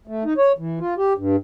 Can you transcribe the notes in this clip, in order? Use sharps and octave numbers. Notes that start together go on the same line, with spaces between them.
A3
D#4
C#5
E3
F4
G4
G2